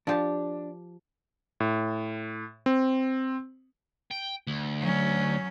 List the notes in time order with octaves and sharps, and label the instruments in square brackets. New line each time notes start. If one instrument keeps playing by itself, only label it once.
[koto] F3 G4 [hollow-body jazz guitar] D4
[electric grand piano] A2
C4
[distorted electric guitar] G5
D2
[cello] F#3 C#4